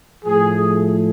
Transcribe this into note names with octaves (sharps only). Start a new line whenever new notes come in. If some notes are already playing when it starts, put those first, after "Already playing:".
A2 F3 A3 G#4